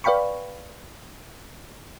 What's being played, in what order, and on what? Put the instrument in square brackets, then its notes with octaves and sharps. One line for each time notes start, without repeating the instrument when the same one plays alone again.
[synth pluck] B4 D5 F5 G5 B5 C#6